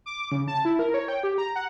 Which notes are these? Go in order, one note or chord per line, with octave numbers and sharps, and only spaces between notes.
D6
C#3
A5
E4
A#4
C#5
G5
G4
A#5
F#5